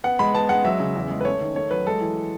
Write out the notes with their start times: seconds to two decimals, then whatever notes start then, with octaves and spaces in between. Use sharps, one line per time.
0.04 B3 F#5
0.19 G#3 B5
0.34 B3 A5
0.49 G#3 F#5
0.64 F#3 E5
0.80 C#3
0.95 E2
1.11 G#3
1.21 B4
1.25 A3 C#5
1.41 D#3
1.55 A3 C#5
1.71 F#3 B4
1.86 G#3 A4
2.01 E3